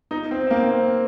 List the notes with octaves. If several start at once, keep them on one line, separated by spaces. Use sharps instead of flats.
D#4
C4
C4
A#3
C4